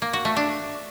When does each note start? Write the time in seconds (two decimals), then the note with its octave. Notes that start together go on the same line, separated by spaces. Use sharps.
0.02 A#3
0.13 F#4
0.25 A3
0.37 D4